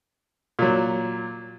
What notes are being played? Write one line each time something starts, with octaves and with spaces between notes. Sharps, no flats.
A#2 F#3